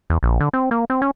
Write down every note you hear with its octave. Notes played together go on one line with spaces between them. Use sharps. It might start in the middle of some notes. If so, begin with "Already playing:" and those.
E2
A#1
D3
C4
A#3
C4
C#4